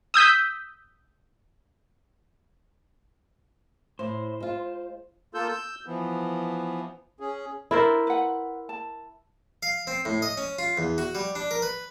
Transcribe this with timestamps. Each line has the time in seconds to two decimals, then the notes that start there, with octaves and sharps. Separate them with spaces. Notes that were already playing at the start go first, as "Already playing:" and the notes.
0.14 D#6 E6 G6 B6
3.99 A2 C5
4.40 G#3 F4
5.34 A#3 F4 A4 E6 G6
5.48 E6 G6
5.86 E3 F3 B3
7.20 C#4 G#4
7.71 D4 E4 A4 A#4 C5
8.07 B4 F#5
8.69 A5
9.63 F5
9.87 C4
10.05 A2
10.22 D#5
10.37 C#4
10.59 F4
10.77 E2
10.98 F#4
11.15 G3
11.35 D4
11.51 A#4
11.62 B4